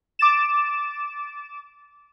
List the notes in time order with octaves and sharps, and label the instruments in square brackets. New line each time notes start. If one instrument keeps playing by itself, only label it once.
[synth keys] D6 A6 E7